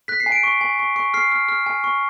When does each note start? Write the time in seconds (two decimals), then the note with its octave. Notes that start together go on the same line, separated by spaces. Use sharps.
0.08 F#6 B6
0.20 C7
0.26 G#5
0.32 D7
0.43 C#6
0.61 G#5
0.79 C#6
0.96 C#6
1.14 F6 C7
1.32 F6
1.48 F6
1.66 G#5
1.84 C#6